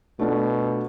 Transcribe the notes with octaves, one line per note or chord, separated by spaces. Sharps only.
B2 A3 D4 F4